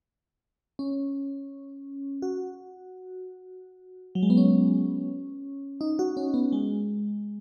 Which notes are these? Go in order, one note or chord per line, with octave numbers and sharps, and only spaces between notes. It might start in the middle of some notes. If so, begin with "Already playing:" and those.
C#4
F#4
F#3
G#3
B3
C#4
D#4
F#4
C#4
B3
G#3